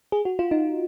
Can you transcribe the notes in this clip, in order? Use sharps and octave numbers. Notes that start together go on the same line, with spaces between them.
G#4
F#4
F4
D#4